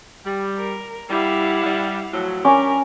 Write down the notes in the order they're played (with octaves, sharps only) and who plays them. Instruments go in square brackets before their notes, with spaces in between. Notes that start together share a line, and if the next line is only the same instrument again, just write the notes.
[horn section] G3
[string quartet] A#4
[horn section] G3 [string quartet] E4 F5 F#5
[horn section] G3
A2 F3 F#3
[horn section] G3 D4 G4 [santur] C#4 D6 [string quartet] A#4